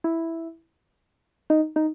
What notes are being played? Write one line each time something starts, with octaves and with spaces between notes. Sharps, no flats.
E4
D#4
D#4